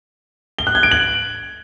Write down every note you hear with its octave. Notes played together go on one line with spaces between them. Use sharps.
G7
F#6
G#6
D7
F#7